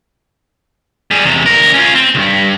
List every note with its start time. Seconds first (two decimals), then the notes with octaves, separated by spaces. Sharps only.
1.11 G3 G#4
1.25 E2 C3
1.46 D2 A#4
1.74 C#4 F4
1.95 C4
2.15 C#2 G2